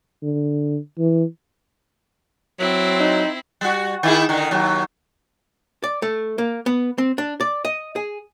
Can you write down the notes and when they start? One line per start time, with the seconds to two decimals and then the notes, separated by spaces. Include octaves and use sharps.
0.23 D3
0.98 E3
2.59 F#3 C4 E4
3.00 D#4
3.61 G3 F#4
4.03 D#3 E4 G#4
4.29 D3 D#3
4.51 D#2 F#3
5.84 D5
6.02 A3
6.38 A#3
6.66 B3
6.98 C4
7.18 D4
7.41 D5
7.65 D#5
7.96 G#4